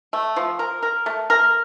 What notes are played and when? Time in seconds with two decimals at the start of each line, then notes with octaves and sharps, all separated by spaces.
0.13 A3
0.36 F3
0.59 A#4
0.83 A#4
1.06 A3
1.30 A#4